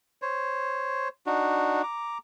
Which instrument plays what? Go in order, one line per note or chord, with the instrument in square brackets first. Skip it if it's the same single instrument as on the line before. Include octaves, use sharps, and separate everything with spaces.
[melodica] C5 C#5
D4 D#4 F#4
A#5 D6